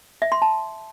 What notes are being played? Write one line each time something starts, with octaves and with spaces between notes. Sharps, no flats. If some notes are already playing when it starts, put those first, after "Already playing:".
E5
C6
A5